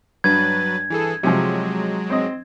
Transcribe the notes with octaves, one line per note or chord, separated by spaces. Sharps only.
G2 F#3 B4 G#6 A6
E3 G#4 A4
C3 F3 F#3 G#3
C4 D#5